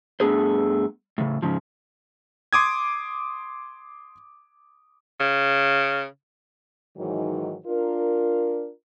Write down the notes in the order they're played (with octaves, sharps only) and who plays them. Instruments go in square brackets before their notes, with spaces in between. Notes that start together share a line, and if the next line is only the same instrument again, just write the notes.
[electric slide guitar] G2 A3 B3 D4 G#4 C5
A2 C#3
G#2 C#3 F3
[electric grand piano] C6 D6 D#6 G#6
[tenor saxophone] C#3
[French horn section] G#2 D#3 E3 F#3
D4 F4 A#4